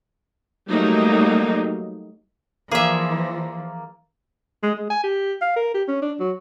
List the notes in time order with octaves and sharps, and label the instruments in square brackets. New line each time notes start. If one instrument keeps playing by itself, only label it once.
[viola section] F#3 G3 A3 A#3 D#4
[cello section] E3 F3 [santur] A#3 D5 [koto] G#4 E5
[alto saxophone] G#3
G#3
G#5
G4
F5
A#4
G4
C#4
D4
F#3